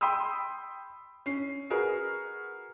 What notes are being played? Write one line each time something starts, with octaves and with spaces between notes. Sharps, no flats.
G5 B5 C6 D#6 E6
C#4 C7
F#4 G#4 A#4 B4